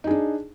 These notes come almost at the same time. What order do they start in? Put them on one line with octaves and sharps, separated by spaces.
D#4 G#4 D4